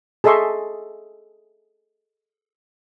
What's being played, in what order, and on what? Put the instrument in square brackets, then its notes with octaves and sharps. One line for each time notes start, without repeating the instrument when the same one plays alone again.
[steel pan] G#4 A4 D#5 E5 C6 C#6